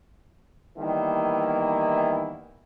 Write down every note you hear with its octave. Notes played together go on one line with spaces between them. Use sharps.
D#3 E3 G3 A#3 B3 E4